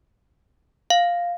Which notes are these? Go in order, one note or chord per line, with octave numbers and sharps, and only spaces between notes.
F5